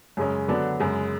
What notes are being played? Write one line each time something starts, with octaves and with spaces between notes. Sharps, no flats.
F#2 C#3 G#3 C#4
D3 F#3 B3 D4
F#2 C#3 G#3